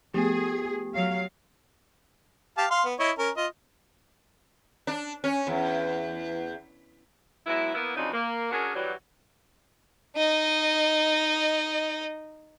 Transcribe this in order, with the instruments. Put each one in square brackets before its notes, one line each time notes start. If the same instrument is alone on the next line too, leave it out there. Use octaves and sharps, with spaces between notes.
[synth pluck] F3 A3 B3 [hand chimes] G4 [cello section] G#4
[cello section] F#3 F5
[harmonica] G4 F5 A5
F5 C6
B3
E4 C#5 D#5
C#4 A#4
F4 D#5
[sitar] D4
C#4
E2
[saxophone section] F#3 G#3 B3 E4
A#3 B3 E4
F2 C#3 F#3 C4 D4 D#4
A#3
C#4 D4 F#4 G#4 A#4
E3 F#3 G3
[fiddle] D#4 D#5